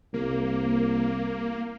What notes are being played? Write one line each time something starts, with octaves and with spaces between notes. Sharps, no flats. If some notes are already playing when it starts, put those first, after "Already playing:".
C2 A#3